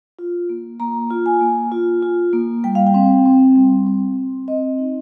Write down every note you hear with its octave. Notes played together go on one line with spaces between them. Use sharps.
F4
A#3
A#3 A#5
F4
G#5
A#3
F4
F4
A#3
G3 G5
F5
G5
C4
C4
G3
C4
C4
C4 D#5
D#4